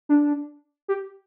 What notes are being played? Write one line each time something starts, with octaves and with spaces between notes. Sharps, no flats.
D4
G4